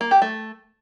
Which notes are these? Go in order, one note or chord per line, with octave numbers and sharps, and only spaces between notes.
A#3
G4
A3